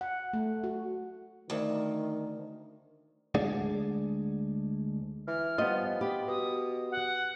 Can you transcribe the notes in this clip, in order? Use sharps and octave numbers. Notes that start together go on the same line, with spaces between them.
F#5
A3
F#4
D2 D#3
D2 G#3 D4 G#4 D5 F#5
E3 F6
F3 G3 B3 F4 D#5
G4 B5
B2 D#6
F#5